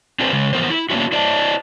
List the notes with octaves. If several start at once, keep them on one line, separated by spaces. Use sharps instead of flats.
C4 D4 F4 G#4 B4 C5
C#3 G#3
E3 F3 G3 B3 A#4 C5
E4
A#3 B3 C#4 D4 E4 F#4
E4 C5 D5 D#5 A5